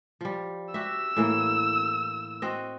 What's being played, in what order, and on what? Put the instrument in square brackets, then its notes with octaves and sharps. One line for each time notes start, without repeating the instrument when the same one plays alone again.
[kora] F3 G3
[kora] F#4 G4 E5 [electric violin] E6
[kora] A2 E3 A#3
C4 F#4 D#5